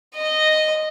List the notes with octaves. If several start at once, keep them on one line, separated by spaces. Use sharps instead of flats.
D#5